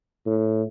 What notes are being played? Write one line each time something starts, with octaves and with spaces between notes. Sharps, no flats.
A2